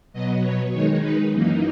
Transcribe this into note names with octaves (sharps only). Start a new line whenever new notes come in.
B2 F#3 B3 D#5
C#5
D#3 G#3 D#4 C#5
B4
F#2 E3 A#3 D#4